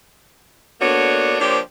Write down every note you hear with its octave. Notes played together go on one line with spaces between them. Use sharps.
D3 A#3 B3 D4 F#4 C#5
F3 A#3 D4 G4 C5 C#5